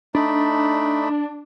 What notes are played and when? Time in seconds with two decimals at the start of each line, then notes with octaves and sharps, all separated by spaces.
0.15 A3 D4 D#4 B5